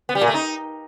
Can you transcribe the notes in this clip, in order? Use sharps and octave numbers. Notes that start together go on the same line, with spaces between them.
B3
G3
A#2
A3
D#4